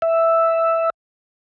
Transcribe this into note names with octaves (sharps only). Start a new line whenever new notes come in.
E5